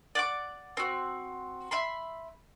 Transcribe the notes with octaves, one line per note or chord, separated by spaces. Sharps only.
D5 F#5 D6
C4 F#4
E5 B5 C6